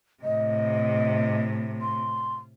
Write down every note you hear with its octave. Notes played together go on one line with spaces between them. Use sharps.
A2 C3 D#5
C6